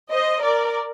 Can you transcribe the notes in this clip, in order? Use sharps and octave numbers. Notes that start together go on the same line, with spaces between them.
C5 D#5
A#4 D5